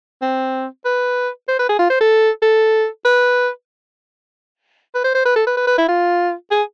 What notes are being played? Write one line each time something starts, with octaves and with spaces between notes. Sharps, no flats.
C4
B4
C5
B4
G#4
F4
C5
A4
A4
B4
B4
C5
C5
B4
A4
B4
B4
B4
E4
F4
G#4